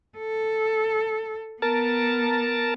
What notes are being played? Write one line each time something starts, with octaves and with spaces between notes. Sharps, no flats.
A4
B3 A#4 A5